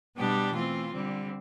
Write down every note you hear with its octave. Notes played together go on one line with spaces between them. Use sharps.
B2 G3 B3 D4 G4
E3 A3 C4 F4
D3 G3 C4